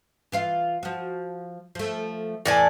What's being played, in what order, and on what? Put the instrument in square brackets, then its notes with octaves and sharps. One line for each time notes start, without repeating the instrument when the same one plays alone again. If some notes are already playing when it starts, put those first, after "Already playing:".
[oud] E3 F4 F5
F3 F#4
F3 A3
[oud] E2 E3 [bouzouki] A2 D5 G#5